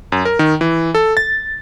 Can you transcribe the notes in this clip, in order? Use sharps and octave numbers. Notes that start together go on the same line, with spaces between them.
F#2
A#4
D#3
E3
A4
A6